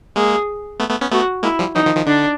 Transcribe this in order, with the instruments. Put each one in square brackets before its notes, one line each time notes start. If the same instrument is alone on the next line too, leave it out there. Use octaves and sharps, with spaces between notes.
[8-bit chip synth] G#3 A#3 [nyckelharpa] G#4
[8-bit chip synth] A3 B3
A3 B3
B3 C#4
[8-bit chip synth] A3 B3 [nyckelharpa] F#4
[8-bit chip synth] G#3 A#3 [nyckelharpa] E4
[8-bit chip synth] F3 G3
[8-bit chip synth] E3 F#3 [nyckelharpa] D#4
[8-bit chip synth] D#3 F3
D#3 F3
[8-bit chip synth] D3 [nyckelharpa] D4